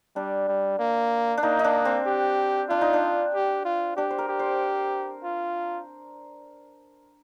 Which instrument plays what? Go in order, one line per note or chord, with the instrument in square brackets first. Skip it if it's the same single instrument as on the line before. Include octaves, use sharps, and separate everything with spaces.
[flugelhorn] G3 [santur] D4
[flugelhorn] G3
A#3
[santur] D4
[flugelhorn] A#3 [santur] D#4
[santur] D#4
D4
C4
[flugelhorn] G4
[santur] D4 [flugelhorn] F4
[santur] D#4
D4
[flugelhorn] G4
F4
[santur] D4 [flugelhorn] G4
[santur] C5
A#4
[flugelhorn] G4
[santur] C5
[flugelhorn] F4